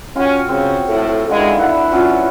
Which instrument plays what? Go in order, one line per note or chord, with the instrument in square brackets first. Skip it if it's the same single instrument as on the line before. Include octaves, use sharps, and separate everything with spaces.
[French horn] C#4 [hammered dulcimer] F4 F#4 G5
[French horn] C#3 [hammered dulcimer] C4 C#5
[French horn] A2 [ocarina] A4
[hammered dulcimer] D3 D#3 E4 [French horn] G#3 [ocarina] F5
[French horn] D4 [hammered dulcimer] E4 B4 F#5
[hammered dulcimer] F#3 C#4 [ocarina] F4